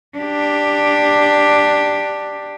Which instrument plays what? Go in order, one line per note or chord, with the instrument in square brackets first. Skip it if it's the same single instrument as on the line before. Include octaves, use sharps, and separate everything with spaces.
[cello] D4 G4